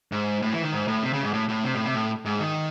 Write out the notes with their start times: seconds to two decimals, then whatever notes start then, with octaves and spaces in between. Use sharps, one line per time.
0.12 G#2
0.42 A2
0.52 E3
0.62 D#3
0.73 G#2
0.88 A2
1.03 C3
1.13 C#3
1.23 G#2
1.34 A2
1.49 A2
1.64 C3
1.75 A2
1.85 C3
1.94 A2
2.25 G#2
2.40 D#3